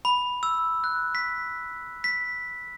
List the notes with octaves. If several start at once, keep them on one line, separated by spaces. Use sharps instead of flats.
B5
E6
F#6
B6
B6